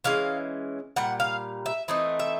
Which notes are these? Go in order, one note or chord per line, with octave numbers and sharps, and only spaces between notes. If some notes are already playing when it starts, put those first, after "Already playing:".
E3 G#3 C#4 F5
A#2 G3 F#5
F5
E5
E3 A3 C4 D#4 D#5
E5